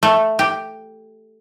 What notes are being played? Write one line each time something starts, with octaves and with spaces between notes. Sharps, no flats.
A3
G4